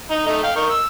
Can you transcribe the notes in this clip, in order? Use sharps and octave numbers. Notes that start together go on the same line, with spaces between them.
D#4
A3 D#4
F5 G5
D#4 A#4 C#6
E6